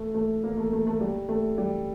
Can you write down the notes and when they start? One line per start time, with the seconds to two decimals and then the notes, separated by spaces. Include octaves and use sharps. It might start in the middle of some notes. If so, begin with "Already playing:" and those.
Already playing: A3
0.14 A3
0.44 A#3
0.58 A3
0.73 A3
0.87 A3
1.01 G3
1.29 A3
1.58 G3